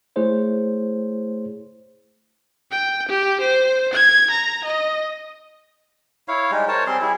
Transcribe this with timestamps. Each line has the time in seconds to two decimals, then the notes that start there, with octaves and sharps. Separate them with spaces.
0.16 A3 E4 G#4 C5 C#5
2.71 G5
3.08 G4
3.41 C5
3.93 G#6
4.30 A#5
4.64 D#5
6.28 E4 C#5 F5
6.51 G3 G#3 D#4
6.68 A#4 C5 C#5 A5
6.87 G3 C4 G#4 C6
7.01 G3 E4 G#4